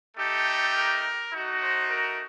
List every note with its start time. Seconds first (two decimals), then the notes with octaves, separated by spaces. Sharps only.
0.17 A3 D#4 G4 A4
0.74 A#4
1.31 A3 D#4 F#4
1.60 C5
1.88 A#4